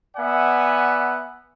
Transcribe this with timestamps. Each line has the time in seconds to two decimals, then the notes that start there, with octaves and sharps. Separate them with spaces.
0.17 B3 D5 E5 F#5 G#5